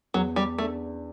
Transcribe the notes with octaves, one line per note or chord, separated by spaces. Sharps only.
E2 F#3
G3
A3 D4